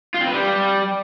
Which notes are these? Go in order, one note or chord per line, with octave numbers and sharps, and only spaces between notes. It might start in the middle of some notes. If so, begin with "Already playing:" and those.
F4
C4
B4
G3